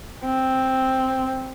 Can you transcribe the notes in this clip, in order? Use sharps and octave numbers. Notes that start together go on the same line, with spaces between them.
C4